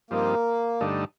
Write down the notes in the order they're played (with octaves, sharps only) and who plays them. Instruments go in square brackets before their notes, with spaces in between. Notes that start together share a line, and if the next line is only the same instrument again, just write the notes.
[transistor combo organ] G2 F3 C4 D#4 [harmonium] A#3
[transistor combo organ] G2 D3 A3 D#4